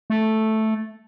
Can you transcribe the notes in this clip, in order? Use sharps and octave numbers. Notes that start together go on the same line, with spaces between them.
A3